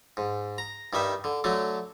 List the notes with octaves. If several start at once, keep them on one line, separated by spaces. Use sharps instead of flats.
G#2
A#5
G2 D#3 G3 E5
D3
D3 F#3 A3